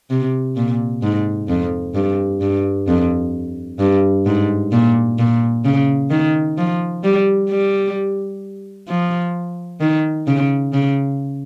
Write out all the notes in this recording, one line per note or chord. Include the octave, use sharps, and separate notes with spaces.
C3
A#2
G#2
F2
G2
G2
F2
G2
G#2
A#2
A#2
C#3
D#3
F3
G3
G3
F3
D#3
C#3
C#3